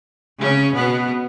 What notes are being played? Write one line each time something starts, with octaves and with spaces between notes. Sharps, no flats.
C#3 C#4
B2 B3